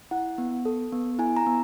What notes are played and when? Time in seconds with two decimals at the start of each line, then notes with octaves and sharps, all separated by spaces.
0.11 E4 F#5
0.38 B3
0.65 A4
0.93 B3
1.19 E4 G#5
1.37 A#5
1.46 B3